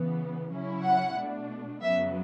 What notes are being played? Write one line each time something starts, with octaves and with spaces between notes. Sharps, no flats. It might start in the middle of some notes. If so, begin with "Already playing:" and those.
Already playing: C#3 E3 B3
C#3 F#3 C#4 E4
F#5
B2 A3 D4
F#2 C#3 F#3 B3 E5